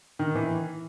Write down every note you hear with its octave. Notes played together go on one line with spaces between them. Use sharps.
D#3
E3